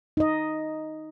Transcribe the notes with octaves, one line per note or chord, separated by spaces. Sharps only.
D#4 D#5